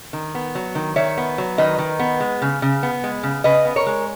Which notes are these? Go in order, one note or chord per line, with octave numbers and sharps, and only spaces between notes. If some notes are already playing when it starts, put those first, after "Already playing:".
D#3
B3
F#3
D#3
D#3 C#5 E5
B3
F#3
D#3 B4 D#5
D#3
B3
G#3
C#3
C#3
B3
G#3
C#3
C#3 B4 D#5
B3
A#4 C#5
G#3